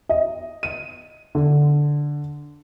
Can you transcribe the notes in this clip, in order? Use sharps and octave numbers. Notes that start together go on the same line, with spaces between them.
D#5
D#7
D3